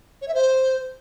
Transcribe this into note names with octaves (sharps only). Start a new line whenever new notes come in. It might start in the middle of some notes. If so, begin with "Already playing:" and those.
C#5
E5
C5